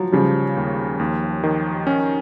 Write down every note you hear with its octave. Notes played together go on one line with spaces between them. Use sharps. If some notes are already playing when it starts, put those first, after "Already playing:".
Already playing: F3 F#3
C#3 F3 G3
D#2
D#2
D#3
C#4